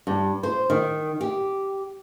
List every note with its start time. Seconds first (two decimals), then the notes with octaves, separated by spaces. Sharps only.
0.07 G2
0.43 C5
0.70 D#3
1.21 G4